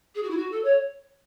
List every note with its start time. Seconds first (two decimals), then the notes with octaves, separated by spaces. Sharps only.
0.14 G#4
0.22 F#4
0.30 E4
0.36 F#4
0.51 A4
0.64 C#5